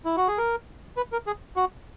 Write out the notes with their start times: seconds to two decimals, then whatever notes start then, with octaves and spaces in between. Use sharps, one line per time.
0.05 E4
0.17 F#4
0.28 G#4
0.38 A#4
0.97 B4
1.12 A#4
1.27 G#4
1.56 F#4